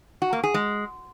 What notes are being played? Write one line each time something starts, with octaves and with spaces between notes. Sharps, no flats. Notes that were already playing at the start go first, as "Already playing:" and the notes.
F#4
A#3
G#4
G#3